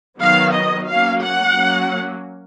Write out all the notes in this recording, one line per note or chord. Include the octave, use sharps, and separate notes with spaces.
D#3 F#3 B3 F5
D#5
F#3 A#3 C#4 F5
F#5
F#3 A#3 C#4